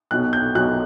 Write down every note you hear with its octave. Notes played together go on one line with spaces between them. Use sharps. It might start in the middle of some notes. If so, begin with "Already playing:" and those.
B1 B2 F#3 F#6
G6
B1 B2 F#3 F#6